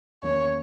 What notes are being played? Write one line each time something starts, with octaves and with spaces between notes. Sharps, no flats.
E2 D#3 F#3 A#3 C#4 C#5